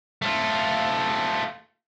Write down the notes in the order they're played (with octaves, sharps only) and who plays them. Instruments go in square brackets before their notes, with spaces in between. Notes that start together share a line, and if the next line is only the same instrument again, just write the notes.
[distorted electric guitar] A3 F4